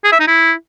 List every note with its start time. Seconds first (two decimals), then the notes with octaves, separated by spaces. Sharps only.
0.05 G#4
0.12 E5
0.20 D#4
0.27 E4